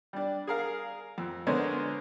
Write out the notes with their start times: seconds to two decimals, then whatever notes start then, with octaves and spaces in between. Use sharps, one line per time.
0.13 G3 D4
0.47 G#4 A#4 F5
1.18 F2
1.47 D3 G#3 B3 A#4 C5 C#5